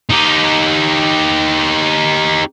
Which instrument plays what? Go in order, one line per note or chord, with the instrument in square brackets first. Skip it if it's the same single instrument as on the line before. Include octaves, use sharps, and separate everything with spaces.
[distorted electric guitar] D#4 G4